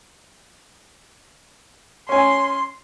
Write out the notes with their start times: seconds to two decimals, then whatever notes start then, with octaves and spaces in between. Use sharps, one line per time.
2.09 C#4 G#5 C6